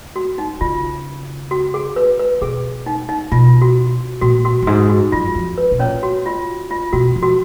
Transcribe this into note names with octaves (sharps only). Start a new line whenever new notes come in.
F#4
D#4
C#3 F4
F#4
G#4
B4
B4
B2 G#4
D#4
D#4
B2 F4
F#4
A#2 F#4
F#4
F#2
G#2 F#4
F#4
F#2 F4
F2
B4
B2
A#2 C#4 C#5
F#4
F4
F4
B2 F#4
F3
F#4